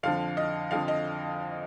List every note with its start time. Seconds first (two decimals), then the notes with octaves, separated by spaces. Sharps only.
0.03 F2 D3 F3 F5
0.37 D#5
0.71 F2 D3 F3 F5
0.88 D#5